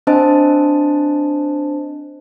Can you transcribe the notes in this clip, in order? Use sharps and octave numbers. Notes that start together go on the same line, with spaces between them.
C4 D4 C5 D#5 A5